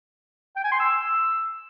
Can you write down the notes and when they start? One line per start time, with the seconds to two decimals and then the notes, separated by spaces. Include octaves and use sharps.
0.56 G5
0.64 G#5
0.72 C6
0.80 E6